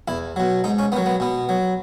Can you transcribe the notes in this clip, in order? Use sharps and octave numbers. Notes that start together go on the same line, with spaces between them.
E2 E4
B2 F#3
G#2 D#4
C#4
D#3 F#3 B3
B3
B2 B3
F#3